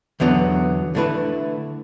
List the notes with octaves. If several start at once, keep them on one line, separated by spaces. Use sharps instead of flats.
E2 D3 F#3 B3
D3 A3 E4 B4